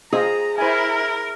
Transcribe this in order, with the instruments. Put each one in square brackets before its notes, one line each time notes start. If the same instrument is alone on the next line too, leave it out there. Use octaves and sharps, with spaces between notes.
[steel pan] F4 C5 D#5 [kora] G#4 [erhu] A#5
[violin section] E4 [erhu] A#4 [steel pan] C5 G#5